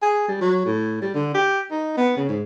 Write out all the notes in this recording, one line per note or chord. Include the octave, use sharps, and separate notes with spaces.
G#4
G3
F#3
A2
G3
D3
G4
D#4
B3
C#3
G#2